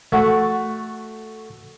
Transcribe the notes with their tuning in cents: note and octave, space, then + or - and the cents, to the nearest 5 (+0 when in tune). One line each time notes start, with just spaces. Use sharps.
A3 +0 F#4 +0